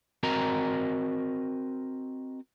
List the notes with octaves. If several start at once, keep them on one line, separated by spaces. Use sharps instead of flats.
C4 F#4 A#4 D#5 A#5